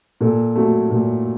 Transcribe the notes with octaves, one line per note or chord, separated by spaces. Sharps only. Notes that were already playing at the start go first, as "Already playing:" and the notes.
A#2 A4
F#3 A3
A#2